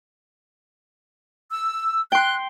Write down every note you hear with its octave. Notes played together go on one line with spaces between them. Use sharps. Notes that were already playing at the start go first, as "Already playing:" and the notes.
E6
G5 C6 F#6